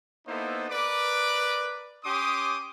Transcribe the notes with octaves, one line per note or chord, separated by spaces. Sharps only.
A#3 B3 D#4 E4 A4 C5
A#4 B4 D5 D6
C#4 G4 C6 D6 D#6